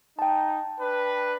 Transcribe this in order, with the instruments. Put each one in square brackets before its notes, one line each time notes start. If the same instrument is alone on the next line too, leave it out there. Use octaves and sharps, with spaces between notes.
[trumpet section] D#4 [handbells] G5 A5
[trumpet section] D4 B4